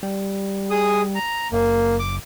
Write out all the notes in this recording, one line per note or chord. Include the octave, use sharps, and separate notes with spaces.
G3
G#4 D#6
A#5
F#1 A#3
D6